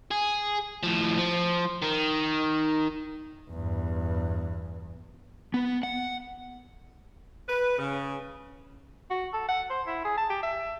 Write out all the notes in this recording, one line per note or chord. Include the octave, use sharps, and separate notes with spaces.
G#4
A2 F3
F3
D#3
E2 G2
B3
F#5
B4
C#3
F#4
A4
F#5
C5
E4
G#4
A5
G4
E5